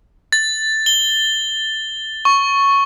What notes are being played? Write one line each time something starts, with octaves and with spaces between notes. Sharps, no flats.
A6
G7
C#6